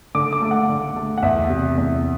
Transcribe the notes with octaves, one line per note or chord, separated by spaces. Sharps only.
D3 D6
D6
A3
F#5
D3
A3
F#5
E2 E5
C3
E2